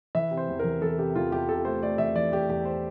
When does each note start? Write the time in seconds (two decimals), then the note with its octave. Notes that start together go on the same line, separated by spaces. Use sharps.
0.15 E3 E5
0.31 C3
0.37 C5
0.49 E2
0.59 E3 A#4
0.82 E3 A4
0.99 C3 G4
1.15 E2 F4
1.31 E2 G4
1.49 C3 A4
1.65 A3 C5
1.83 A3 D5
1.98 E2 E5
2.15 E3 D5
2.32 A3 G4
2.49 E2 G4
2.65 C5